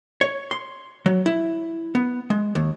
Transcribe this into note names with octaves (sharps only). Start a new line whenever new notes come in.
C#5
C6
F#3
E4
B3
G#3
D#2